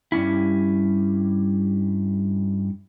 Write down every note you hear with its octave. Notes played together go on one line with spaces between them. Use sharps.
G2 G3 C#4 E4